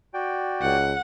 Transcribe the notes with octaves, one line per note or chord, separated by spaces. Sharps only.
F#4 D5 G5
C#2 F#5